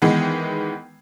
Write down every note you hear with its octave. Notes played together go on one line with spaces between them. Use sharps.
D#3 E3 G#3 B3